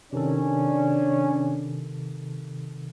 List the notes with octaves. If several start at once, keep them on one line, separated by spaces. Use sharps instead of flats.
C3 D#3 C#4 D4 A4